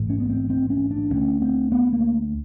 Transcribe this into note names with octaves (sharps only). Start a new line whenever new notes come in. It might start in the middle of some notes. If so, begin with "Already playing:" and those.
Already playing: A1 G#2
C#4
B3
C4
C4
C#4
D4
D2 D3 C#4
C4
B3
A#3